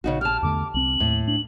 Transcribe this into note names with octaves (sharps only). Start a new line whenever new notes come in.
A#1 C#3 D#4 F#4
G4 A5 F6
E2 D3 A3 D6
C2 C4 F#7
D#2 A2
D4 F#7